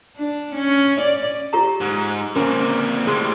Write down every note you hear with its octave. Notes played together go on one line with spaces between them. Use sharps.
D4
C#4
D5
F4 G4 A#5
G#2
A#2 C4 C#4 A#4
A2 G3 G#4 C6